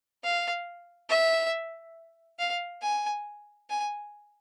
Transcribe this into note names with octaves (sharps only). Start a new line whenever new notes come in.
F5
E5
F5
G#5
G#5